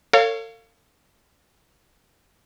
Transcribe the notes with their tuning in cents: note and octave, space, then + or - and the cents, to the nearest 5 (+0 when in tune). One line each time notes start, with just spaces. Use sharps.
A4 +45 C#5 +0 F5 +0